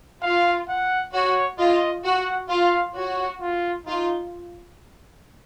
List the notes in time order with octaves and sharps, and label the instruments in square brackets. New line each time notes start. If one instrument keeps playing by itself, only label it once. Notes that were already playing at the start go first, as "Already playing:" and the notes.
[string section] F4 [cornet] F5
[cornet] F#5
[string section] F#4 [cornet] C#5
[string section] F4 [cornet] D#5
[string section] F#4 [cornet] F#5
[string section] F4 [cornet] F5
[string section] F#4 [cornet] C#5
[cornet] F4
[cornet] D#4 [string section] F4